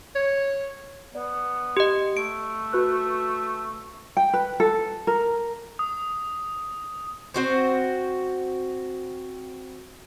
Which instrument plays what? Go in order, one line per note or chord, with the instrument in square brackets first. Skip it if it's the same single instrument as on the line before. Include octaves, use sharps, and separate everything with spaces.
[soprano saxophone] C#5
[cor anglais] B3 [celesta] D5
[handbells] G4 D#5
[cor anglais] A3 [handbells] D7
[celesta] F#4 B4 F#6
[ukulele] G5
B4
A4
A#4
[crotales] D#6
[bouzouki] C4 F#4 C5